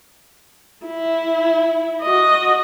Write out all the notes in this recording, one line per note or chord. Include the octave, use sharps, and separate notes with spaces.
E4
F#4 D#5